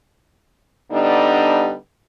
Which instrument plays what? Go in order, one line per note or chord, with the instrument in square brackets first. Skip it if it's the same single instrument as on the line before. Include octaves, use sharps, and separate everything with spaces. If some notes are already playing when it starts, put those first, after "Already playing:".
[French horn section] D3 G3 B3 D4 D#4